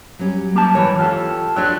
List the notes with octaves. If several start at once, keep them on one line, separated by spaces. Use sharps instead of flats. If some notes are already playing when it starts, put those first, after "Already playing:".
F#3 G3 C#4
A#3 G4 A5
G#2 E3 B4 C#5
F4 G4 A4
F#3 D4 F4 G4 C#5 G5